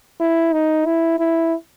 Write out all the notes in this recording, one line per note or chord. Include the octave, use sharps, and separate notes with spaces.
E4
D#4
E4
E4